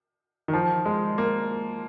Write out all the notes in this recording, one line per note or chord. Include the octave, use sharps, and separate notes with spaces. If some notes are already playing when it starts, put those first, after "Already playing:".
D#3
F3
G#3
A#3